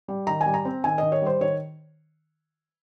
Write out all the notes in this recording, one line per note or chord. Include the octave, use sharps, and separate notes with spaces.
G3
D#3 A#5
G#5
G3
A#5
C4
D#3 G#5
D#3 D#5
C#5
G3 C5
D#3 C#5